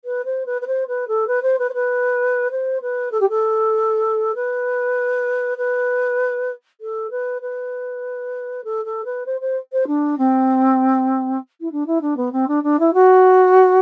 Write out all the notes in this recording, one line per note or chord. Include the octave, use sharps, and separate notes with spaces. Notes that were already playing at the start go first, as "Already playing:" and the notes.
B4
C5
B4
B4
C5
B4
A4
B4
C5
B4
C5
B4
C5
B4
A4
G4
A4
B4
B4
A4
B4
B4
A4
A4
B4
C5
C5
C5
D4
C4
E4
D4
E4
D4
B3
C4
D4
D4
E4
F#4